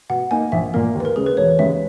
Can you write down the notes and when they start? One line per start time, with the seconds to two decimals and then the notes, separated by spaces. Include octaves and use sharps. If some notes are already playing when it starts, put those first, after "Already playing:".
0.10 B2 F#5
0.31 A#3 D#4 G#5
0.52 A#1 E5
0.74 A#2 A#3 A#4
0.95 D#2
1.00 B4
1.05 A#4
1.16 C#3 G#3 G#4
1.26 B4
1.37 E1 C#5
1.59 D#2 C#3 E3 G#3 E5